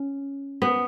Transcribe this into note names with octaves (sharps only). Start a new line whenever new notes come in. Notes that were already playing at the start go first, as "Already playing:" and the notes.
Already playing: C#4
B3